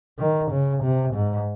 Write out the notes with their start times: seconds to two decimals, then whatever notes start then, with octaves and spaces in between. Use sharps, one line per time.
0.19 D#3
0.51 C#3
0.83 C3
1.14 G#2